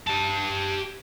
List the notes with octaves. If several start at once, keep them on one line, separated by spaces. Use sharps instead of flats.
G4 A5